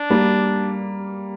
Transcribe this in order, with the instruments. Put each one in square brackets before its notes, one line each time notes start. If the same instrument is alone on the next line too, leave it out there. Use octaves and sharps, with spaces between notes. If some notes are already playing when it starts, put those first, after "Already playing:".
Already playing: [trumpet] D4
[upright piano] G3 A#3